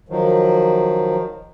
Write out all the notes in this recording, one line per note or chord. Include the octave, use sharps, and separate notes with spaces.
D#3 F3 F#3